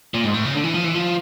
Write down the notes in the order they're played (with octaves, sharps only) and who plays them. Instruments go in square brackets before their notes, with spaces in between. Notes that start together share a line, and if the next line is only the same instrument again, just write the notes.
[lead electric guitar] A#2
G#2
A2
C#3
D3
E3
F3
E3
F3